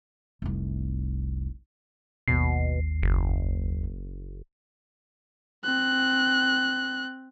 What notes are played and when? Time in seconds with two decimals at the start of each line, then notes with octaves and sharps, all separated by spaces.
0.42 F1 C2
2.28 G#1 D#2 B2 C7
3.03 F#1
5.64 C4 F#6